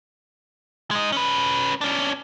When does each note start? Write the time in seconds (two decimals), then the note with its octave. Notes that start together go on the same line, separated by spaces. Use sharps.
0.91 G#3 D#4
1.12 C#4 B4
1.81 C#4 D4